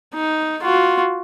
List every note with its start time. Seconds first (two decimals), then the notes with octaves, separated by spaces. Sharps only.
0.15 D#4
0.63 F4 F#4